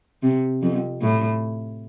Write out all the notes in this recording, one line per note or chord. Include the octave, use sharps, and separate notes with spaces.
C3
F2
A2